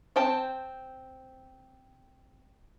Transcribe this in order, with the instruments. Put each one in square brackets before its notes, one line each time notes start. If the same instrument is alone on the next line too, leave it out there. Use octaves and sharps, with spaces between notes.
[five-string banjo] C4 C5 G5 A5